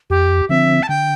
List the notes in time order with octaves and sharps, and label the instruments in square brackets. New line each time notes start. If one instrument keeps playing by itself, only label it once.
[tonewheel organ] F2 [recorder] G4
[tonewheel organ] D3 F3 C4 [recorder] E5
[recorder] A5
[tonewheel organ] D3 [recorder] G5